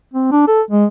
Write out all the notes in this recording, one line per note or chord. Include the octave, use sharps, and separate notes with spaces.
C4
D4
A4
G#3